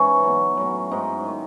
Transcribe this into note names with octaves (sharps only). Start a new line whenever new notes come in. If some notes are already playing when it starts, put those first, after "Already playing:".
Already playing: G#2 E3 C#4
B2 F#3
A2 F#3
G#2 F#3 D#4
D#3 F#3